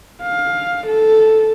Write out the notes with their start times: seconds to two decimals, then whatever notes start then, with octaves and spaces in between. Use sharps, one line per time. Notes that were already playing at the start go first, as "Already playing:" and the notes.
0.23 F5
0.87 A4